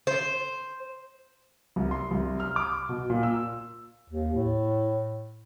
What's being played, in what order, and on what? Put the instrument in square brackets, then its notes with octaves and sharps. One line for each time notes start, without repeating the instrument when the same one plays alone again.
[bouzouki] C5
[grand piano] C2
C6
C2
F6
D6
B2
A#2
E6
[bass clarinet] D#2
A2